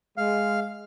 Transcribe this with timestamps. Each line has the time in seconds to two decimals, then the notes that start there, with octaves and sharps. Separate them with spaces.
0.17 G#3 F5